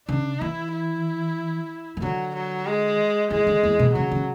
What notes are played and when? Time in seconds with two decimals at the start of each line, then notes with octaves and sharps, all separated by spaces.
0.08 C#3 D4
0.40 E3 E4
0.73 E4
1.97 E3
2.02 D3 F#3
2.35 F#3
2.66 G#3
3.30 E3 G#3
3.47 D3
3.63 E2
3.79 B2
3.94 C#3 F#3
4.11 C#3